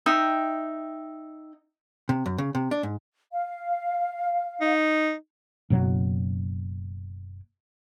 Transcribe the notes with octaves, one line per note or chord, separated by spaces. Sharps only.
D#4 E5 G5
C3
F#2
C#3
C3
D4
G#2
F5
D#4
F#1 B2 F#3